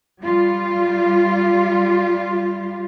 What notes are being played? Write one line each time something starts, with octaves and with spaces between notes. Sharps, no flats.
G3 F4